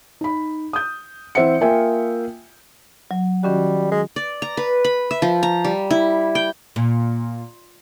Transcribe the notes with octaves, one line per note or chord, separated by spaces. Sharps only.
D#4 B5
D#6 G6
E3 C4 C5 E5 F#5 C#7
A#3 F4 A#4 E5 G5 G#5
F#3
D#3 G3 C#4 F#4
G#3
D5
A#5
B4
B5
E5
F3
A#5
G3
E4
G5
A#2